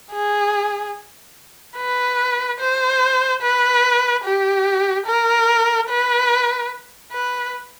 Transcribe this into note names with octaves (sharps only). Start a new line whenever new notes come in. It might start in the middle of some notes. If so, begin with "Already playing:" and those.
G#4
B4
C5
B4
G4
A#4
B4
B4